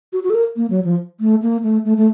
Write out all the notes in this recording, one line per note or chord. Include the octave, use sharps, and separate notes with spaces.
F#4
F#4
A4
A#4
A#3
F#3
F3
A3
A#3
A3
A3
A3